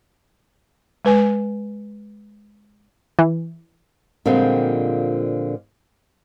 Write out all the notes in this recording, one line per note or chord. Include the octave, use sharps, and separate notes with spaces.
G#3 B4 G#5
E3
A#2 D3 F3 G3 G#3 C4